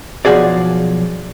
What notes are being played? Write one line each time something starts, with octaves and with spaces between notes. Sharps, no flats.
B1 F3 F#4 G#4 D5